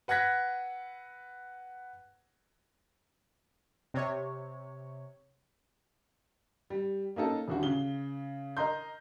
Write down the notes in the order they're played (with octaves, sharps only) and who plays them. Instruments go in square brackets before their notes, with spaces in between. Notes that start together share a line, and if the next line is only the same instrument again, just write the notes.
[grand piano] B4 F#5 F#6 G#6 A#6 B6
[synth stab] C3 C#5
[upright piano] G3
A#3 C#4 D#4 A4
D#1 D3 F#4
C#3 G7
A#4 D#5 A#5 C6 G6